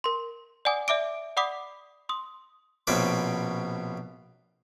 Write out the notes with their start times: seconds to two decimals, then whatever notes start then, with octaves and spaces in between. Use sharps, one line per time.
0.04 A#4 C6
0.65 D5 F#5 G#5 D6 D#6
0.88 D5 E5 D6 D7
1.37 D5 F#5 B5 D6 D#6 B6
2.09 C6 D#6
2.87 A#1 B2 C4 C#4 B5 D6